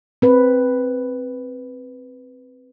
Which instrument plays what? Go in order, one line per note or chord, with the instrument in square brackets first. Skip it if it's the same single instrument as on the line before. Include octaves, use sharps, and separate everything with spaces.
[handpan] C4 B4